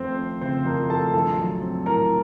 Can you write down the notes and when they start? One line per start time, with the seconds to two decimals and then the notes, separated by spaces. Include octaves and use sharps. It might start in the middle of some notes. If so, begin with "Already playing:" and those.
Already playing: F2 A3 C4 C5
0.18 C4
0.41 C#3 C4 C5
0.65 F2 A#4
0.90 A3 A4 A5
1.13 A#1 A4 A5
1.38 F#3
1.61 C4
1.85 A2 A#4 A#5